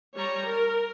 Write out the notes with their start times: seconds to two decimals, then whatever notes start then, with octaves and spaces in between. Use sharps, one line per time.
0.15 G3 C#5 A#5
0.48 A#4